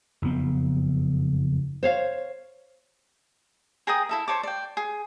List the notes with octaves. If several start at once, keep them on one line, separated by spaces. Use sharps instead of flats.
F#1 F2 B3 C4
C5 C#5 F5
G#4 A#4 G5 D#6
E4 A4 E5
C5 C#5 A5 D6
D5 G5
G#4